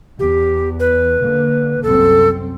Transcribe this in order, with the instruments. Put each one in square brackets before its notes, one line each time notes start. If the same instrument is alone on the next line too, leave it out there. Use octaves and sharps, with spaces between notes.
[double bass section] E2 [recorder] G4
[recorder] B4
[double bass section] D3 A#3
[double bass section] C2 F#2 C4 [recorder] A4